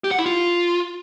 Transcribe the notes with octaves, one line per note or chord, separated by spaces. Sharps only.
G4
F#5
E4
F4